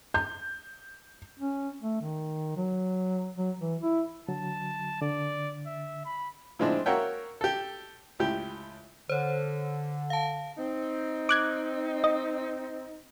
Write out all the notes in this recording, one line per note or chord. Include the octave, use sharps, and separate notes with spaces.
G6
C#4
A3
D#3
F#3
F#3
E3
E4
D3 F#3 A5
D3 D5
E5
B5
A2 F3 G#3 C4 D4
A#3 F#4 A#4 C#5 E5 G5
G4 A4
C#2 A2 G4
D3 C5 C#5
F5 A5
C4 D#4
D6 F#6 G#6
D#5